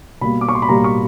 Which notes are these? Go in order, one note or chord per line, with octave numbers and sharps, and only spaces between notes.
B2 G3 A#3 B5
D6
C#6
C6
B5
B2 G3 A#3 A#5
C#6